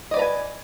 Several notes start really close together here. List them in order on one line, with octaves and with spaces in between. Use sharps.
D#5 D5 B4 A#5 G#5